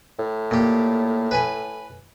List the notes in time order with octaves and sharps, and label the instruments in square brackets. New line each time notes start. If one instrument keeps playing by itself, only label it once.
[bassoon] A2
[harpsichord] A#2 G4
B4 G#5 B5